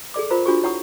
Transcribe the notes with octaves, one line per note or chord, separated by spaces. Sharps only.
G#4 A4 D5 D6
F4 A#4 C5 A#5
D4 F4 F#4 G#4 C#6
E4 C#5 F#5 A#5 C#6 D#6